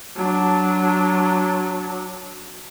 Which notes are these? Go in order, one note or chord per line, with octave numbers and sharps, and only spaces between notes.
F#3 D4